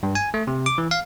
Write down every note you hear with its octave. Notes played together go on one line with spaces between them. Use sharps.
G2
G#5
A3
C3
D6
E3
F5